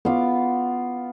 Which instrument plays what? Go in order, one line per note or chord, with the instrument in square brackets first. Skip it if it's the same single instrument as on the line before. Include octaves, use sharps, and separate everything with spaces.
[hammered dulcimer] B3 F4 D6